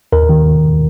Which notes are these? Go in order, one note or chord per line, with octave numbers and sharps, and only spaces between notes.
D#2 A#4
D#3